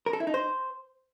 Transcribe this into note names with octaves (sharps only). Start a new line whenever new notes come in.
A#4
A4
E4
D#4
C5